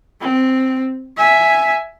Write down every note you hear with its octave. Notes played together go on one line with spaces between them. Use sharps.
C4
E5 G#5